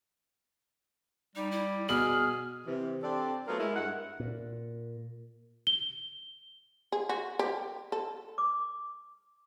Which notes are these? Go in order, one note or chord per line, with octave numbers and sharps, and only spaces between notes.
G3 D#4
E4
B2 G#4 F6 F#7
C3 E3
C4 D4 G4 A4 D5
F#3 A3 B3 F4 A4 A#4
G#3 E4 A#4
G2 G#3 E5 F#5
A#2
G7
G#4
F#4
G4
A4
D6